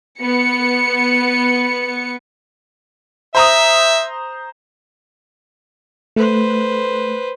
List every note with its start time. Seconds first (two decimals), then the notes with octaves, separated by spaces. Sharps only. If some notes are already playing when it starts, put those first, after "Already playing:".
0.21 B3 C#7
3.35 C5 E5 A#5 D#6
6.16 A3 B4 C5